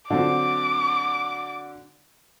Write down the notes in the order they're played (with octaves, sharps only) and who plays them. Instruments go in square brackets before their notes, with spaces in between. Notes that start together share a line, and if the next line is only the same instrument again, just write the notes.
[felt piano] D3 F#3 C4 [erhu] D6